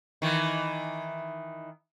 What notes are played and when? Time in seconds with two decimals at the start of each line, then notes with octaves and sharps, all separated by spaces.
0.22 D#3 E3